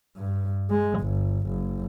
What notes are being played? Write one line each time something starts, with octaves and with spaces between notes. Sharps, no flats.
G2
G#3
G1
F#1